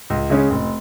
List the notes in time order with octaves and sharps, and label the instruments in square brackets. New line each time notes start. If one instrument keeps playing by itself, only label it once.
[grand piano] C#2
C#3 G#3 C#4
F1